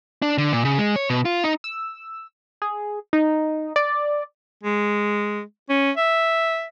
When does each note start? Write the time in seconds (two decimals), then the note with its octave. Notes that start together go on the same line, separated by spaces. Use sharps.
0.22 D4
0.38 D3
0.53 A#2
0.65 C#3
0.78 G#3
0.96 C#5
1.10 B2
1.25 F4
1.44 D#4
1.64 E6
2.62 G#4
3.13 D#4
3.76 D5
4.63 G#3
5.70 C#4
5.97 E5